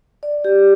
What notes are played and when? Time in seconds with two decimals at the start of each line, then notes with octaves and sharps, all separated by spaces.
0.23 D5
0.45 G4